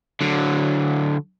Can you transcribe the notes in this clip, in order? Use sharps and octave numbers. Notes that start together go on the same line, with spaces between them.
D3 F#3